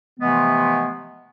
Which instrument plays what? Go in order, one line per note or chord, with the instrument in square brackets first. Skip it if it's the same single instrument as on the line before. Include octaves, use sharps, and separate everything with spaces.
[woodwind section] C3 E3 F3 G#3 A3 B3